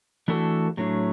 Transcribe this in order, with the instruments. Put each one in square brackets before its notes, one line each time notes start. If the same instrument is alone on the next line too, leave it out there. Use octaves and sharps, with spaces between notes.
[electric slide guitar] E3 A3 D4 F#4 A4
A2 F#3 A3 D4